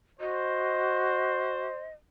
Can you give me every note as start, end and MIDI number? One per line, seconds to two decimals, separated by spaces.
0.20 1.67 66
0.20 1.90 72
0.20 1.90 75